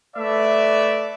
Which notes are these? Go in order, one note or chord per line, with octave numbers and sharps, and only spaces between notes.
A3 B4 D5 E5